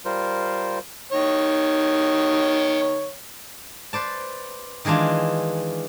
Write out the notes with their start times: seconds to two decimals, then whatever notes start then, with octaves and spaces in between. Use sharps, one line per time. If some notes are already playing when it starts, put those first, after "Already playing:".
0.05 G3 F4 A#4 C5
1.12 D#3 C#5
3.93 B4 C5 D5 A5
4.85 D#3 E3 G#3 D4 F4